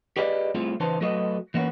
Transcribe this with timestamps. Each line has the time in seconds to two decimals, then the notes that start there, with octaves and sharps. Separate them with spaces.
0.17 G4 G#4 B4 D5 D#5
0.55 G3 A3 C4 E4 F4 G#4
0.80 C#3 E3 D#4 B4 C5 A5
1.01 F#3 A3 F#4 A4 B4 D#5
1.54 E3 A#3 B3 C#4